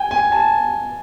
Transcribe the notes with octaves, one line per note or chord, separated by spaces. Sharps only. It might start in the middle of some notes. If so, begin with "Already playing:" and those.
Already playing: G5 G#5
G#5
A5